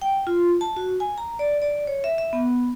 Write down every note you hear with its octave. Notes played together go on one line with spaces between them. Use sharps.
G5
F4
A5
F#4
G#5
A#5
D5
D5
C#5
E5
E5
B3